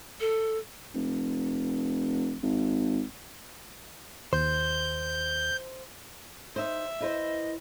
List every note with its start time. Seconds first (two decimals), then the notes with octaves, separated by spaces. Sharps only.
0.20 A4
0.95 F1
2.43 G#1
4.33 D#2 C5 G6
6.56 D#4 C5 E5
7.00 E4 B4 C5 D#5